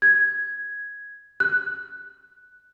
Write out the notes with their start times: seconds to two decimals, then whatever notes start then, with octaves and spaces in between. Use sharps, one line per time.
0.02 G#6
1.40 F#6